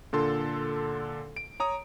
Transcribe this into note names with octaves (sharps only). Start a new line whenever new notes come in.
A#2 D3 A4 C6
D7
C#5 A#5 D#6